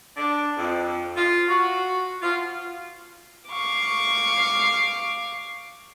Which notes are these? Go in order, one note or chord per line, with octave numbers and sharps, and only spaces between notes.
D4
F2
F4
F#4
F4
F5 C#6 D6